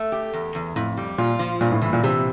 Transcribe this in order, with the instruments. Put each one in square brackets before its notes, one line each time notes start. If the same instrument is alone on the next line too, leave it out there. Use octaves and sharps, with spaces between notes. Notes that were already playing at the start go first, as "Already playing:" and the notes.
Already playing: [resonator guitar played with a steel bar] A3
G4
E2
E2
[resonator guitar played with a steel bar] F2 [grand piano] A2
[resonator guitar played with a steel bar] G3
[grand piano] A#2 [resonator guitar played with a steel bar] F4
[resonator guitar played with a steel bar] F3
[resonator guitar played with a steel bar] G2 [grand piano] A#2
[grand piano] A2
[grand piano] A2 [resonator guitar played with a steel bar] E3
[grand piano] A#2
[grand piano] C3 [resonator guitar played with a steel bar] E3